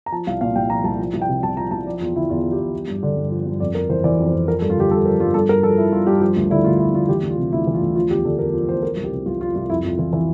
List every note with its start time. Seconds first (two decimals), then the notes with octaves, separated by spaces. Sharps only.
0.06 A#5
0.12 F3 A5
0.27 C2 F5
0.41 A#2 F5
0.56 C2 G5
0.70 F3 A#5
0.84 C2 A5
0.99 F3
1.14 C2
1.22 G5
1.29 C3
1.43 C2 A5
1.57 F3 A#5
1.71 C2 A5
1.86 F3 D5
2.00 E2 F4
2.15 D3 E4
2.30 E2 F4
2.44 F3
2.52 G4
2.59 E2
2.73 F3
2.88 G2
3.03 D3
3.16 G2
3.31 F3
3.46 G2
3.60 F2 D5
3.75 F2 A#4
3.89 E3 C5
4.04 E3 D5
4.19 F2
4.26 C5
4.33 F2
4.48 F3 A#4
4.59 A4
4.62 G2
4.70 F4
4.76 D3 G4
4.91 G2 A4
5.06 F3 A#4
5.20 G2 F4
5.34 G2 A4
5.49 G2 A#4
5.63 F3 A4
5.78 F3 E4
5.92 G2 F4
6.07 G2 G4
6.21 F3 G4
6.37 D2
6.50 D3 E4
6.64 D2 F4
6.80 F3 E4
6.94 D2 F4
7.09 E3 G4
7.23 D2
7.30 F4
7.38 C3
7.52 D2 E4
7.67 E3
7.74 F4
7.81 D2
7.95 F3 F4
8.10 E2 G4
8.25 D3 A4
8.39 E2 A#4
8.53 F3
8.68 E2 C5
8.83 F3 A#4
8.97 C2
9.04 G4
9.11 C3
9.26 C2 F4
9.40 F3 F4
9.55 C2 F4
9.70 F2 E4
9.84 F2 F4
9.98 E3 F4
10.13 E3